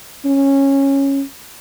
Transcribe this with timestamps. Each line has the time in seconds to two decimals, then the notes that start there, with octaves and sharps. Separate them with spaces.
0.25 C#4